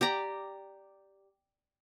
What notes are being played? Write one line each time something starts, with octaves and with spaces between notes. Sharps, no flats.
G4 D5 A#5